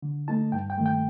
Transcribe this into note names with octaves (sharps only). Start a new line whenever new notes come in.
D3
A3 D#4 A5
G2 G5
G5
D#3 A3
G5